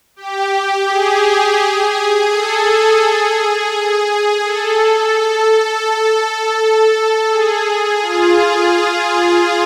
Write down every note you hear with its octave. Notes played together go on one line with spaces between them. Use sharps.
G4
G#4
A4
A4
G#4
A4
G#4
F4